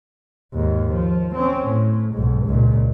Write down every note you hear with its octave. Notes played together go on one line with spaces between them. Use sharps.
D#2 G#2
F3
C4 C#4
A2
B1 G#2
C#2 A#2